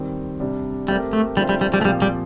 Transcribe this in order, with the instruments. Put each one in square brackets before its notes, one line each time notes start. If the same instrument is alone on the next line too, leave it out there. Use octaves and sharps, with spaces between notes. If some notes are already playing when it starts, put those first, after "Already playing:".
Already playing: [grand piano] D#3 G3 C4
C3 G3 D4
[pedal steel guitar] G3 [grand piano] A3 C4 G4 A#4
[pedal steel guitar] A3
[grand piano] D3 A3 C4 F4 C5 [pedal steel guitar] G3
[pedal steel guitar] G3
G3
G3
A3
[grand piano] A#2 F3 C4 G4 [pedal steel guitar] G3
[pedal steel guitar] G3